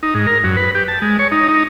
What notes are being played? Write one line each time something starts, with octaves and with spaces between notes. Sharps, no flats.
D#4
G#2
A#4
F#2
B4
G4
A5
G#3
C#5
D#4
D#4